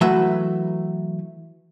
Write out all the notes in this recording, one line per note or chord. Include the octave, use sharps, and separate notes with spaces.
E3 F#3 A3 B4 E5